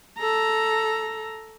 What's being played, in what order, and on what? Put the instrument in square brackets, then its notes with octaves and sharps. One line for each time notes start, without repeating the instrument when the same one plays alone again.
[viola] A4 A#5